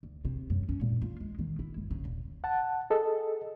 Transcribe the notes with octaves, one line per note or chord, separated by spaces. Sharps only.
D2
C3
F#2
C#4
A#2
F4
G#3
D#3
E4
G1
C#3
D#1
F#5 A5
G#4 A4 D#5